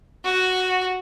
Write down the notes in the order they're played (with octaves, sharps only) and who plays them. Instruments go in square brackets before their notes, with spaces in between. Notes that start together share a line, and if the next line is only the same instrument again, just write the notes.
[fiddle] F#4